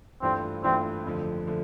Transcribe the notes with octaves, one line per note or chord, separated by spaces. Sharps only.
G2 E3 A3 C4 D4 F4
G2 E3 A3 C4 D4 F4
F2 D3 F3 A3
D3 F3 A3